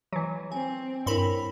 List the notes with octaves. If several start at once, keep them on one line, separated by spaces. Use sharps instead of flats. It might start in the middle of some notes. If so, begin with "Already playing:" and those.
E3 F#3
C4 G#5
G2 E4 A#4 C#5 B5